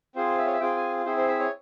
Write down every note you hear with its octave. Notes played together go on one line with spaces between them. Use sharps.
C4 F4 G#4 C5
E5
C#5
E5
C4 F4 G#4 G5
G#5
C4 E4 G#4 C5
C5
E5
C#5